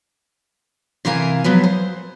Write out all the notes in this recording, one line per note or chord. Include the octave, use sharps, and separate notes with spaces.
C3 E3 A#4 F5 G#5
F3 F#3 G#3 B3
C5